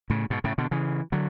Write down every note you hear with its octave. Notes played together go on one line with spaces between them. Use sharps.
A2 C#3
G#2 B2
A2 C#3
B2 D3
C#3 E3
D3 F#3